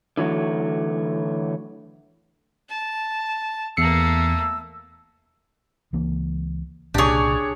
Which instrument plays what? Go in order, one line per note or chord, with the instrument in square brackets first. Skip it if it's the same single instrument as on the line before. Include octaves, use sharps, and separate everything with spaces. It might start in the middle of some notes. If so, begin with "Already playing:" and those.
[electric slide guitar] D3 E3 F#3 A3
[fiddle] A5
[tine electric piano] E2 C7 C#7 [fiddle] A3 A#3 [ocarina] E6
[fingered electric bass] C#2 E3 A#3
[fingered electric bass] C2 A#2 C#3 [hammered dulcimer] D4 C#5 [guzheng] G4 G#4